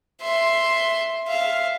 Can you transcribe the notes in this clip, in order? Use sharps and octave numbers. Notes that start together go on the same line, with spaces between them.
E5 C6
E5 F5